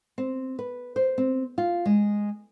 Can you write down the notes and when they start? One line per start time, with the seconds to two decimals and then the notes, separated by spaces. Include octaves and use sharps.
0.18 C4
0.59 B4
0.96 C5
1.18 C4
1.58 F4
1.85 G#3